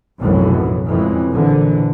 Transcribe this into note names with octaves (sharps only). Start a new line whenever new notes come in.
F1 B1 F#2 A2 E3 F#3
F2 C#3 E3 F3 G#3
A#1 D3 E3